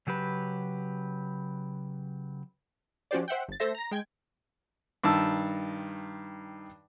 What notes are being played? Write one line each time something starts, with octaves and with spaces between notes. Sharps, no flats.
C#3 F#3 G4 B4
F3 C#4 F#4 G4 C5 D5
C5 E5 F#5 G5
G1 A6
A3 A4 C5 E5 A#6
A#5 A#6
G#3 G5 G#6
G2 D#3 A5 E6